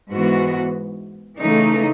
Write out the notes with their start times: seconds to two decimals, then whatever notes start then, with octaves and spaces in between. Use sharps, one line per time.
0.12 G#2 E3 B3 F#4
1.39 C#3 E3 A3 D#4